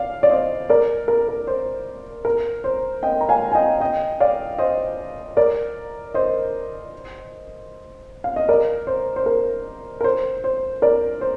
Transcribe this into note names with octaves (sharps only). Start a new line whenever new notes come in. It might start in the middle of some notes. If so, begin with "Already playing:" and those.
Already playing: D5 F5
D5
C5 D#5
A#4 D5
A#4
A#4
C5
A#4
C5
D#5 G5
A#5
F5 G#5
G#5
D#5 G5
D#5 G5
D5 F5
C5 D#5
A#4 D5
C5 D#5
F5
D#5
A#4 D5
C5
C5
A#4
A#4
C5
C5
A#4 D5
C5